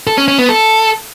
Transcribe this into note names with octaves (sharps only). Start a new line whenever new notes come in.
A4
C#4
C#4
B3
A4